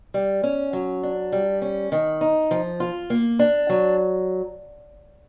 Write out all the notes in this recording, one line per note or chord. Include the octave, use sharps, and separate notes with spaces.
G3
C#4
F#3
D4
G3
C#4
D#3
D#4
F3
F4
A#3
D4
F#3